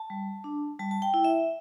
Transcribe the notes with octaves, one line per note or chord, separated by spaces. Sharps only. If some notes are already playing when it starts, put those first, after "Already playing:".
Already playing: A5
G3
D4
G3 A5
A5
G5
E4
E5